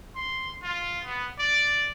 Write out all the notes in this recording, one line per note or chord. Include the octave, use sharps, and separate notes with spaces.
C6
F4
B3
D5